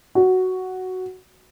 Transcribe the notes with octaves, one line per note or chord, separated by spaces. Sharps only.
F#4